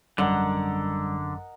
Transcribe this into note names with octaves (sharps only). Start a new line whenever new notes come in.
G#1 F#2 D3 G3 A#4 D#5 F#5